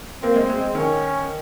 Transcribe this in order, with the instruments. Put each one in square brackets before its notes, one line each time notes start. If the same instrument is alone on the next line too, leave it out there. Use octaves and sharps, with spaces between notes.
[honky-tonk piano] A#3 [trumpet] C4
[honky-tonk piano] G#3
G#3
[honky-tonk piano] D#3 [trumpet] C#4